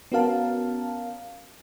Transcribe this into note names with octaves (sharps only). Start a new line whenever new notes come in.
B3 C#4 F#4 A#4 F5 A5